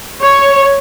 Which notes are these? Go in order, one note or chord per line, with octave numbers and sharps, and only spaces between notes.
C#5